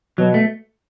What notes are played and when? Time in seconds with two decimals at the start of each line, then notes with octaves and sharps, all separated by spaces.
0.18 B2 F#3
0.34 A3